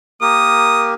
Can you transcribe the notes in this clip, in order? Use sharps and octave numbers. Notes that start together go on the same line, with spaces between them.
A#3 G4 A#4 D#6